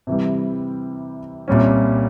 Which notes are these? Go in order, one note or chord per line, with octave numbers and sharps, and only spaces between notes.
C3 E3 G3
C2 A#2 G3 C#4